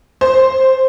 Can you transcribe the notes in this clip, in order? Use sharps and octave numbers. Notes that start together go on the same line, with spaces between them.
C5